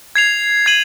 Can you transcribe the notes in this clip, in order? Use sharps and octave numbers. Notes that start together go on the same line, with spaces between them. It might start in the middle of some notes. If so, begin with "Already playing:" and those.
G#6 C7 F7
G#6 D#7 F#7